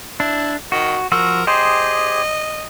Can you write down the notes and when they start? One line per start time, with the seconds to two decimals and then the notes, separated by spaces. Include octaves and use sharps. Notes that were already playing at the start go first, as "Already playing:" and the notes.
0.20 D4 E4
0.72 D#3 F#4
1.12 F3 F#4 A#4 E6
1.47 G4 G#4 C5 D#5